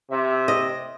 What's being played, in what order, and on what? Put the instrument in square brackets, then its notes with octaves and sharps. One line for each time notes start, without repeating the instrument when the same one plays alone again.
[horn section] C3 E5
[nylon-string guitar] D#5